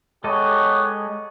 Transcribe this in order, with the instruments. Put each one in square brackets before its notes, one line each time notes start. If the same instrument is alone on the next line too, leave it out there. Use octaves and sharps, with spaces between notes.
[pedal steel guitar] G#3 A4 D#5 [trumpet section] B3 G4 C#5